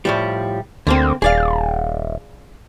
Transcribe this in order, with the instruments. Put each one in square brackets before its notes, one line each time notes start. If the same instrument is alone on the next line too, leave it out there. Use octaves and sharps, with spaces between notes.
[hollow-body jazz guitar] A2 F3 G3
[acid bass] D2 [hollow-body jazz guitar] D3 A#3 C4
[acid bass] D#1 [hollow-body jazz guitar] G#4 D5 F5